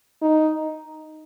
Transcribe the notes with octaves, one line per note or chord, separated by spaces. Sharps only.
D#4